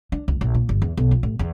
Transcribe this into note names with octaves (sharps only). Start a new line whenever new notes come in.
D4
C#2
A#1
A#2
G1
E2
B1
F3
A1
E2